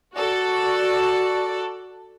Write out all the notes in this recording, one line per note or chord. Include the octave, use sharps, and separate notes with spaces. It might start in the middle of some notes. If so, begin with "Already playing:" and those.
F#4 A4 D5